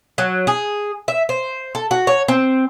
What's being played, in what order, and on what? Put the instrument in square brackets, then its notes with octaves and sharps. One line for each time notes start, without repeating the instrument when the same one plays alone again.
[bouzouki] F#3
G#4
E5
C5
A4
F#4
C#5
C4